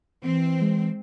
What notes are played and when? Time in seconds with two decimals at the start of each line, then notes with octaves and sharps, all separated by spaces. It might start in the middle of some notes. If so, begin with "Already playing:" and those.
0.23 E3 C4
0.61 G#3